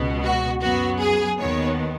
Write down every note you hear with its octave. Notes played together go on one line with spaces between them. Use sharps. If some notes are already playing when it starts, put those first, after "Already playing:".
Already playing: C#2 B2 B3
F#4
F#2 F#3 B3 F#4
G#4
D#2 D#3 B3 C#5